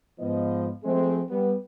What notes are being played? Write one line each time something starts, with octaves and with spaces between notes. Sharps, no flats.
G#2 F3 B3 D#5
F3 G#3 A3 C4
G3 B3